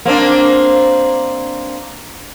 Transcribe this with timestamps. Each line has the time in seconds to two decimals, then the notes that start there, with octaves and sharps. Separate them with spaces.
0.05 A#3 C4 D4